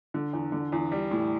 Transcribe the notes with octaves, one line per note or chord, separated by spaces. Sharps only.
D3
E2
D3
E2
G3
A2